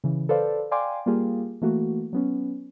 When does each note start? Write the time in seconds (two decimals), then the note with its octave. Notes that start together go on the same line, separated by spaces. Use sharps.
0.04 C#3 E3
0.29 A4 B4 C5 D5 F5
0.71 D5 F5 G5 G#5 C6 D6
1.06 G3 A#3 F4 G4 G#4
1.62 E3 A3 A#3 F#4
2.13 F#3 B3 C#4